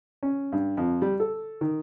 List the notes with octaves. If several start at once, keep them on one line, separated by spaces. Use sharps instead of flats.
C#4
G2
F2
G3
A4
D#3